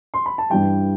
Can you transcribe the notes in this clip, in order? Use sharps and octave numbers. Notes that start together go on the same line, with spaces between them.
C6
B5
A5
G2 E3 G3 G5